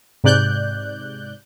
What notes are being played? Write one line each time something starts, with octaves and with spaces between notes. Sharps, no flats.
G#2 C3 D5 F#6 G6